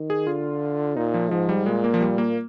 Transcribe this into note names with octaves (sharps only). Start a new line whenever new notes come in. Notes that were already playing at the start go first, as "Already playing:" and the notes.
Already playing: D#3
G#4
D3 F4
A#2 D#4
F3
G#2 F3
G3
A#2 G#3
A#3
F3
G3
A#3